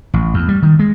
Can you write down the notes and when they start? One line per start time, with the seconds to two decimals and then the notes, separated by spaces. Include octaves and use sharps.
0.14 A1
0.34 E2
0.49 G3
0.63 D#3
0.79 G#3